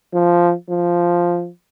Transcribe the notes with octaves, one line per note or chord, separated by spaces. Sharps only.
F3
F3